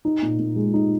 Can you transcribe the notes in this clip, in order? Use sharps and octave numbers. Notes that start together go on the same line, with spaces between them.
D#4
A#2
A#2
G#3
D#4